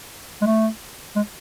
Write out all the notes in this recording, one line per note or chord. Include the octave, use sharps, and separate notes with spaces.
G#3
A3
G#3